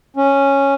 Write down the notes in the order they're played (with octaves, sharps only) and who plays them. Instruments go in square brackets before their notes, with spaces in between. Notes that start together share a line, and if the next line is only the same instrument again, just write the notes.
[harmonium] C#4